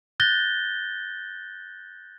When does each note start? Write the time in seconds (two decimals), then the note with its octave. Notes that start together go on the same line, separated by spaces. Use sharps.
0.20 F#6 G6 A6 A#6 G7